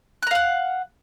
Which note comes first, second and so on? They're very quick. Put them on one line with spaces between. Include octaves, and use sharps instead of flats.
F#6 A#5 F5 F#5